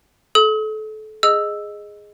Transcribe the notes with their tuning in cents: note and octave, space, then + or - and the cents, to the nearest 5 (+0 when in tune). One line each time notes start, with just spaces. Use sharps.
A4 -30 D#6 +45
G#4 +0 D#5 -5 E6 +0